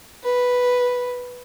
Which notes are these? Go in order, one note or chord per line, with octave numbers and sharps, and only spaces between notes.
B4